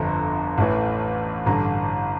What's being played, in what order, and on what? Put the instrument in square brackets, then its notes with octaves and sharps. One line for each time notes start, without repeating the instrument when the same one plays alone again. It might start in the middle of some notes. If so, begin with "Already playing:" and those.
Already playing: [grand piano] G1 F2 D3 A#5
A1 A2 E3
A1 G2 D3 A#5